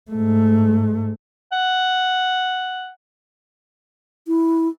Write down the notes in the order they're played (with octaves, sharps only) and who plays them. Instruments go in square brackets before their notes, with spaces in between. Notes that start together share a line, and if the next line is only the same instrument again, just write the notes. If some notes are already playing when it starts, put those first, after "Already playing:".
[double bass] G#2 A3
[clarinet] F#5
[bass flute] E4